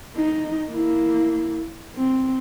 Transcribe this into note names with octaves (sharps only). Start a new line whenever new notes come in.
D#4
A#3 E4
C4